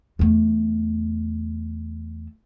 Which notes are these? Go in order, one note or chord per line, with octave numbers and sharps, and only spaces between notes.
E2 A3